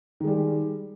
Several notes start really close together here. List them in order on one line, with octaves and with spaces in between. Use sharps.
D#3 G#3 G3